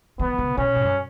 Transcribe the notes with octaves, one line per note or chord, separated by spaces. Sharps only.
E3 B3
C#3
B2 C#4
G#2
F#2